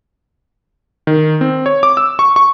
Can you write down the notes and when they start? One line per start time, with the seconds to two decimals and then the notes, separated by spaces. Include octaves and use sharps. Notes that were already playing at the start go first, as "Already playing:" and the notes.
1.07 D#3
1.41 C4
1.66 C#5
1.83 D6
1.97 E6
2.19 C#6
2.36 C#6